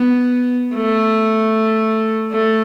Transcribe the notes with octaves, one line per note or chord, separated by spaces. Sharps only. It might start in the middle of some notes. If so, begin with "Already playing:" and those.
Already playing: B3
A3
A3